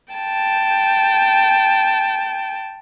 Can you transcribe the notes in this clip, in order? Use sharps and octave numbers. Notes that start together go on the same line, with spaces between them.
G5 A5